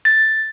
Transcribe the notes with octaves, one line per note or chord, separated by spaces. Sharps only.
A6